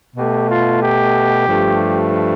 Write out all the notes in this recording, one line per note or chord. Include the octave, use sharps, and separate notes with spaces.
B2 A3 G4
F4
G4
G2 F3 A3